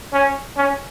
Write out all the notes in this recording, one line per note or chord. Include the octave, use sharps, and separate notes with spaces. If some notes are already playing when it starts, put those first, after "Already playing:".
C#4
C#4